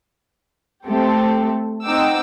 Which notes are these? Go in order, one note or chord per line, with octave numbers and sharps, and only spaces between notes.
A3 C4 G4 A4
C4 D#4 F#5 G5 D6 E6